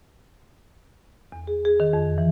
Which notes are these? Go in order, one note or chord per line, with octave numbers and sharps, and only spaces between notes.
E2
G#4
G#4
D#3
F2
E3